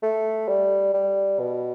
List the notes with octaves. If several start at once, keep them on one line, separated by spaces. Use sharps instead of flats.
A3
G3
G3
B2